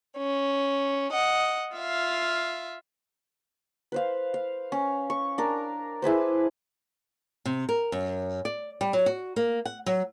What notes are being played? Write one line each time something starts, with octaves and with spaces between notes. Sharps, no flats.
C#4
D#5 F#5
F4 E5 F5
B4 C5 F5
F5
C#4
C#6
D4 A#4
E4 G#4 B4 C5
C3
A#4
F#2
D5
G3
F#3
F#4
A#3
F#5
F#3